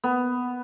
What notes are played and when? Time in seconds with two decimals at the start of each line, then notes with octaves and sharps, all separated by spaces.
0.04 B3